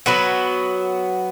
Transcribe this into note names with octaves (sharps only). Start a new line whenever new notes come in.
F#3 B3 F#4